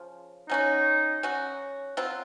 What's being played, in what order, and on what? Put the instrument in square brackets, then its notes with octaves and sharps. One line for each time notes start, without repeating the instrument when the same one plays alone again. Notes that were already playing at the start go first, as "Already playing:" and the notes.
Already playing: [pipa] C#3 F3
[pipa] F#3 C#4 F#4 [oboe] D#4
[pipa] F#3 C#4 F#4
F#3 C4 F4